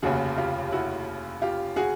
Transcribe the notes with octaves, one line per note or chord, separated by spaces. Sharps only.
F1 D#2 C#3 F#4 G#4
F4 G4
E4 F#4
F4 G4
F#4 G#4